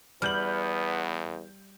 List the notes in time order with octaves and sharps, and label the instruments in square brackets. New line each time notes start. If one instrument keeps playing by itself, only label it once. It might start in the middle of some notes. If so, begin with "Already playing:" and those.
[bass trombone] E2 [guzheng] G3 [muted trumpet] B3 [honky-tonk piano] F6 G6 F#7